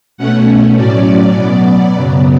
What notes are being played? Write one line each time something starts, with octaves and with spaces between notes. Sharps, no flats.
B2 A3 C#4 F#5
A2 F#3 C#4 D5
B2 F#3 B3
F#2 C#3 F#3 B3